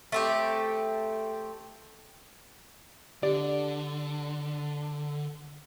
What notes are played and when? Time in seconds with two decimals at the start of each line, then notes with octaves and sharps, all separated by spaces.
0.12 A3 C4 G4
3.23 D3 G4 D5